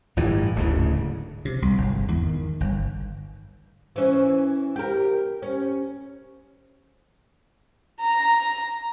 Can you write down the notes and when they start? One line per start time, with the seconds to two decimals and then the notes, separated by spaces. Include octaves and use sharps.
0.17 G1 A2 E3
0.55 D1 D2 G#2 C#3
1.45 C3
1.62 C2
1.78 G1
1.92 G#2
2.08 E2
2.23 D#3
2.60 G1
3.96 E3 C#4
4.76 G4 A#4
5.42 C#4
8.00 A#5